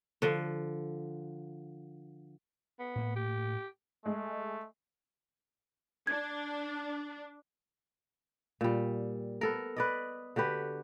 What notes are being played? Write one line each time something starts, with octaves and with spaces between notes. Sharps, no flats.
D3 F3
B3
A2 A#3
G4
G#3 A3
D4 G#6
A#2 G3
B3 A4 A#4
B4 D5 D#5
D3 F#4 G4 B4